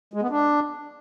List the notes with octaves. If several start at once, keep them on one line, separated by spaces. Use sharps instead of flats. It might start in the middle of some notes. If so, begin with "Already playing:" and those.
G#3
B3
D4